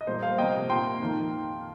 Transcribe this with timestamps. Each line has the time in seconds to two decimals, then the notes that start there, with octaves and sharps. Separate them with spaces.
0.01 D#5
0.07 A#2 G3 A#3 C5
0.23 C5 F5
0.38 C3 F3 A#3 D#5 G5
0.69 A#2 A#3 G5 C6
1.00 F2 D#3 A#3